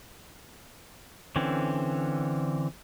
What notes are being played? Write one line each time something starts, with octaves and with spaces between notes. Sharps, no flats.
D3 E3 C4 C#4